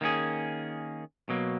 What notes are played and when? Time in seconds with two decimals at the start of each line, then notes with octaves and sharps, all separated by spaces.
0.01 D#3 A#3 C#4 G#4
1.29 B2 F#3 A#3